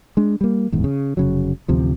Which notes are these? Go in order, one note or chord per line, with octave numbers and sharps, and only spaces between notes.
G#3 D4
G3 A#3
D#1 E2 G#2
C#3
F1 C#3 F#3
A1 D2 C3 F3